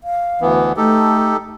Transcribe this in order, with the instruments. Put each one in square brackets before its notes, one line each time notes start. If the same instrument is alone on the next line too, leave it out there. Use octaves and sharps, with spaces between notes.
[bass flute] F5
[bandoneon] D2 E3 B3
[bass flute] A3 [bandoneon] D#4 G4 A4